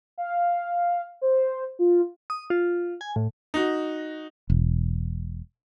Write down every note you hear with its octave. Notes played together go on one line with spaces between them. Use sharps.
F5
C5
F4
D#6
F4
G#5
A2
D#4 F#4
E1